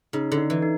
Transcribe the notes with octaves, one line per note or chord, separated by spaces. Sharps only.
C#3 D#4
D3
D#4
E3
D#4